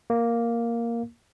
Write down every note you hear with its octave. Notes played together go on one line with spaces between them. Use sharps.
A#3